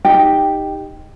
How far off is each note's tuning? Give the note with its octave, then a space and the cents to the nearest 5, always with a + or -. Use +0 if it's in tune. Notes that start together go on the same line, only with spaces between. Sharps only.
D#4 +0 G4 +10 G5 +0